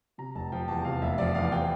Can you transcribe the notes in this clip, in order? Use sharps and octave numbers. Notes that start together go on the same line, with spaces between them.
C3 A#5
F1 A5
F3 G5
E2 A5
C3 F5
F1 E5
F3 D5
E2 F5
E3 G5